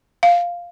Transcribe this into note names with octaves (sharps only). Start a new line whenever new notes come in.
F5